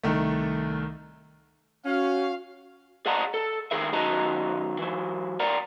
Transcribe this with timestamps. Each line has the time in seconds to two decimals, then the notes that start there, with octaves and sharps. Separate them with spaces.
0.04 C2 D#3 A3
1.86 C#4 F#4 F5
3.06 G#4 D5 D#5 F#5 A5 A#5
3.34 A4
3.71 D#3 G#4 A#4 E5
3.93 F#2 D#3 F#4 D#5 A5 A#5
4.79 E3 F#3
5.40 A#4 D5 F#5 A#5